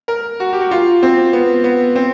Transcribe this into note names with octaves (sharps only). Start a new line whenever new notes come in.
A#4
F#4
G4
F#4
F4
C4
B3
B3
C4